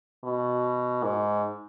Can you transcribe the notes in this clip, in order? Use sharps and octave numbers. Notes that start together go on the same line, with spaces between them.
B2
G#2